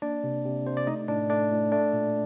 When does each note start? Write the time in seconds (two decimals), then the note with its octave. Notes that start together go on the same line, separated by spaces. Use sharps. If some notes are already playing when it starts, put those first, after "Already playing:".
0.02 A#3 D4 D5
0.24 C3
0.45 C3
0.66 C3 C5
0.77 D5
0.87 A3 D#4 D#5
1.08 A2 D4 D5
1.30 A3 D4 D5
1.51 A2
1.72 A3 D4 D5
1.93 A#2